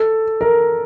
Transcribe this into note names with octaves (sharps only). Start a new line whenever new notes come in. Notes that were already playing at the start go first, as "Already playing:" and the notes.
Already playing: A4
A#4